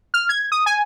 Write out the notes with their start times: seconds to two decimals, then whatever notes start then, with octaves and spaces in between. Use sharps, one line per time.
0.14 F6
0.29 G#6
0.52 D#6
0.66 G#5